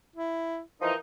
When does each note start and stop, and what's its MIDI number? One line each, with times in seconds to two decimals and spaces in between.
0.16 0.60 64
0.82 0.93 52
0.82 0.93 53
0.82 0.93 63
0.82 0.98 70